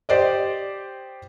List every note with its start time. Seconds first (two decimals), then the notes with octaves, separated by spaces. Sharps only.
0.09 G4 C5 D5 D#5